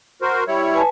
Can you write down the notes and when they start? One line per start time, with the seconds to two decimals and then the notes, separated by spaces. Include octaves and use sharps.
0.22 F#4 A#4 C5
0.47 G3 E4 C#5
0.74 B4 G#5 A5